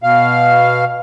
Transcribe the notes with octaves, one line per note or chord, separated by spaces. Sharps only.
B2 F5